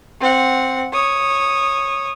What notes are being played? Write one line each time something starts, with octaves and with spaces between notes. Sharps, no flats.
C4 F#5
C#5 D#6